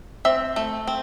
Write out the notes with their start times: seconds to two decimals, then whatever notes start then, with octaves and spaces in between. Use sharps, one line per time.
0.25 C4 E5
0.56 A3
0.87 C4